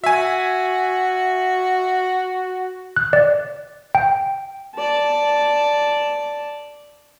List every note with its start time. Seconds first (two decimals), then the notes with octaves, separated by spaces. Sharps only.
0.04 F#4 E5 G#5
2.96 F#6
3.13 D5
3.95 G5
4.75 D5 A5